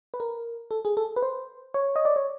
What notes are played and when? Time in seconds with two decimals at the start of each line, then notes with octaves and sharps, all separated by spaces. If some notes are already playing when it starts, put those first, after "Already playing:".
0.14 B4
0.20 A#4
0.71 A4
0.85 G#4
0.97 A4
1.16 B4
1.22 C5
1.74 C#5
1.96 D#5
2.05 D5
2.16 C#5